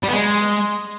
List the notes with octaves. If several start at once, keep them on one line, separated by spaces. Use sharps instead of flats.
G3
B3
G#3